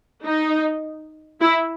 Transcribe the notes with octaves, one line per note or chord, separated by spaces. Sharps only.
D#4
E4